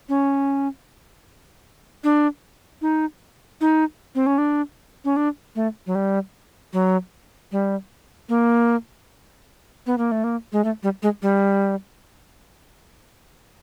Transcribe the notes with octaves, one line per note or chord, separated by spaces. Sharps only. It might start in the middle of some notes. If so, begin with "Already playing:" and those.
C#4
D4
D#4
D#4
C4
C#4
D4
C#4
D4
A3
F#3
G3
F#3
G3
A#3
B3
A#3
A3
A#3
G#3
A3
G3
G#3
G3